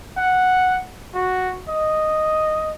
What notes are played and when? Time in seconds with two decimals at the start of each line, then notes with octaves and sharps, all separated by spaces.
0.17 F#5
1.14 F#4
1.69 D#5